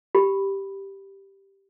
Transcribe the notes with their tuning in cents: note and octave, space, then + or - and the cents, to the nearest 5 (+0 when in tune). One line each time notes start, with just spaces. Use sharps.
G4 +0 B5 +0